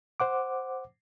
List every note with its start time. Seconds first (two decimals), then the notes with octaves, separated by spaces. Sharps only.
0.20 C5 F#5 D6